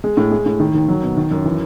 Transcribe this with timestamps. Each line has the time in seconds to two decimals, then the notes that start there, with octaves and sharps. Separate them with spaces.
0.04 G#3
0.17 A2
0.31 G#3
0.46 A2
0.60 D#3
0.74 D#2
0.88 F#3
1.03 B2
1.17 D#3
1.31 F#2
1.45 E3